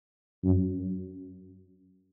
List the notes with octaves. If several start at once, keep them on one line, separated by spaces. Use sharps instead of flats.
F#2